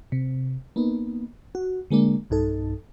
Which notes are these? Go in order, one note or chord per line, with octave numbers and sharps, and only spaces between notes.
C3
A#3 B3 D#4
F#4
D3 G#3 A#3 D4
B1 G2 D#4 A4